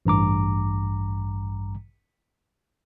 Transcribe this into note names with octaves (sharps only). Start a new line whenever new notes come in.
A1 G2 A#5 D6